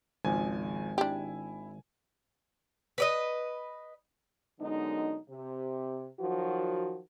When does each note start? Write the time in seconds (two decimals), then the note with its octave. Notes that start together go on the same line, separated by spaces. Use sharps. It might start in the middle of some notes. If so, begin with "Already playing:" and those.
0.25 G#1 C#2 F3 G#3 G#5
0.98 D4 E4 G4
2.98 B4 D5 D#5
4.60 F#2 D3 G#3 B3 D#4
5.29 C3
6.19 D#3 F3 F#3 F#4